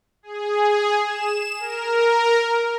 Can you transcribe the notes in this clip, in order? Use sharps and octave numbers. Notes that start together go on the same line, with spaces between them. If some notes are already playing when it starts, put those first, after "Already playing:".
G#4
E7
A#4